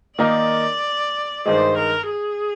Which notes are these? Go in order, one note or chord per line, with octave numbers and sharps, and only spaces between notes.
D#3 A#3 D#4 A#4 D5
G2 D#3 G#3 C5
A#4
G#4